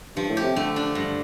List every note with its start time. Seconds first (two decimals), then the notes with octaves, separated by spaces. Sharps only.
0.16 G2 F3
0.29 A2
0.37 G4
0.42 C3
0.56 D3 A3
0.76 D4
0.95 G2